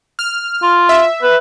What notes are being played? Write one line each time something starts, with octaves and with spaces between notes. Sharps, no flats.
F6
F4
E5
B4